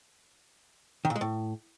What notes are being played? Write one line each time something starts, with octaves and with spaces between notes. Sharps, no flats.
D#3
A#2
G#3
A2